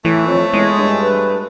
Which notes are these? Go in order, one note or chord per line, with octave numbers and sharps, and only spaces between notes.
A2 E3 A3
F2 C#5
E2 G#3
G2
B4